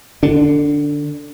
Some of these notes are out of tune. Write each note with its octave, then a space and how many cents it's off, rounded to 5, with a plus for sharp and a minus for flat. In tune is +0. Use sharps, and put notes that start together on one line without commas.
D3 +20 D4 -10